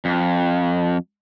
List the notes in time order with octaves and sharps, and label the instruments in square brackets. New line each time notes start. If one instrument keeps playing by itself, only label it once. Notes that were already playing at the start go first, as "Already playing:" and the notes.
[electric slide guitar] F2